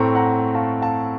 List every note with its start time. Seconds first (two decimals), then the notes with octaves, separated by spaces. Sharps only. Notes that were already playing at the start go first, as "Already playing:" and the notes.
Already playing: A2 A3 C4 A#5 C#6
0.15 F#5 A#5
0.55 F5 A5
0.82 F5 A5